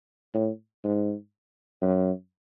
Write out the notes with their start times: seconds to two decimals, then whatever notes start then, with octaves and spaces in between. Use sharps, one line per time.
0.34 A2
0.84 G#2
1.81 F#2